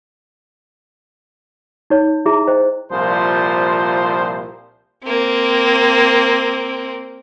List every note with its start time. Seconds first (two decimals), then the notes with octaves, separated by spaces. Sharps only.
1.90 D#4 C#5
2.26 E4 G#4 E5 A#5
2.47 C5 D#5 G5
2.91 C2 A#2 F3 C5
5.04 A#3 C4